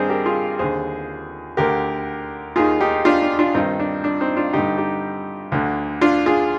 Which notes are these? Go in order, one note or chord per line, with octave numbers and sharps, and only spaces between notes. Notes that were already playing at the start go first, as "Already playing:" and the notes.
Already playing: G2 D#3 C4 D4 D#4 G#4 C5
G4 A#4
F4 G#4
D#2 D3 G#4 C5
D2 D3 G4 A#4
D#2 D#3 F4 G#4
D#4 G4
D4 F4
D4
D4 F4
G2 D#3 C4 D#4
D4
D4
C4 D#4
D4 F4
G2 D3 D#4 G4
D#4 G4
D2 D3
D4 F4
F4 G#4